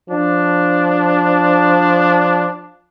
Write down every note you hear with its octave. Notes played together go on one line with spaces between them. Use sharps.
F3 D4